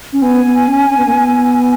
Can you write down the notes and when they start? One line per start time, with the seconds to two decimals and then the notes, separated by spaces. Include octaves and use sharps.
0.13 C#4
0.22 B3 G#5
0.45 B3
0.68 C#4
0.90 C#4
0.98 B3
1.06 A#3
1.13 B3